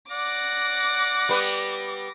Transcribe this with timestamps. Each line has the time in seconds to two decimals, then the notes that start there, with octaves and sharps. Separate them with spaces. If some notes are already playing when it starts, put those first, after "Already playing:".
0.11 D5 F#5 D6 A#6
1.29 G3 B3 B4